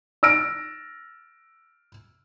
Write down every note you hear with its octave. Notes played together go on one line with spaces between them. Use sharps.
E6 F6 A#6 D7